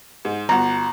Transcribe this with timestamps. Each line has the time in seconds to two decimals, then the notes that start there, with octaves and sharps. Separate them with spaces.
0.25 G#2
0.49 G1 F#4 A#5